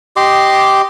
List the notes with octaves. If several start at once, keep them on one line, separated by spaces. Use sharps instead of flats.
G4 D#5 C6 D6